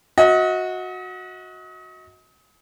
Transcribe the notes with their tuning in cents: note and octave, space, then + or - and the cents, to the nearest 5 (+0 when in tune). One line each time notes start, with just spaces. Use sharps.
F#4 -15 D#5 +35